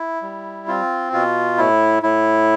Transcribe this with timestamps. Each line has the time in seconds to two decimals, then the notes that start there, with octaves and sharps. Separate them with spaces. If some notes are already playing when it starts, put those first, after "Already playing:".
Already playing: E4
0.22 G3
0.67 C4 F4
1.13 B2 F4
1.57 A2 E4
2.03 A2 E4